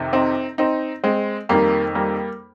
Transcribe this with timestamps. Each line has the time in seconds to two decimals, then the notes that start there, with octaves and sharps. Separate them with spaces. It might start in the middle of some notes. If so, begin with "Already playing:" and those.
Already playing: F2 C3 D#3
0.13 C4 D#4
0.58 C4 D#4
1.04 G#3 C4
1.49 F2 D#3 G3 A#3
1.95 G3 A#3